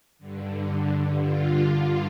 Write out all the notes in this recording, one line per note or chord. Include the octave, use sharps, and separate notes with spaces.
G2 D3
F4
F4